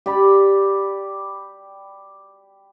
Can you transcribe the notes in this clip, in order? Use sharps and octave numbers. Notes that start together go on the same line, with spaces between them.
G4 D5 B5